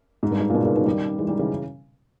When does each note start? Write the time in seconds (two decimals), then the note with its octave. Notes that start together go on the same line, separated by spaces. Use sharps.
0.23 G#2
0.31 G2
0.39 G#2
0.50 A#2
0.54 G#2 B2
0.65 A#2 C#3
0.75 B2 D#3
0.86 D#3 G3
1.18 E3 G#3
1.28 D#3 G3
1.39 C#3 E3